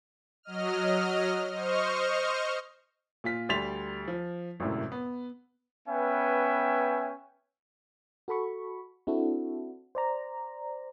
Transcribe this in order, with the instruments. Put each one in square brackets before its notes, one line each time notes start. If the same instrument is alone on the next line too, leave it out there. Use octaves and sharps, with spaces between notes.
[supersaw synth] F#3 D#5 F6
C5 D#5 C#6 F6
[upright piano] A#2 F4 B6
D2 G3 C6 A6 B6 F7
F3
G#1 F#2 A2 C3
B3
[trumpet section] B3 C#4 B4 E5 G5 G#5
[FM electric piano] F#4 A4 B5 C#6
C4 D4 E4 F#4 A4
C5 D5 A#5